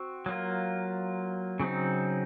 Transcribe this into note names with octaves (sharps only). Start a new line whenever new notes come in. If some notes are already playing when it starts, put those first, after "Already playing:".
Already playing: C4 F#4
F#3 A#3 F4
C#3 F#3 C4 D#4